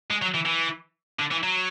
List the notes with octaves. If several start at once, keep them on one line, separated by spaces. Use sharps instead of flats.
G#3
F#3
E3
E3
D3
E3
F#3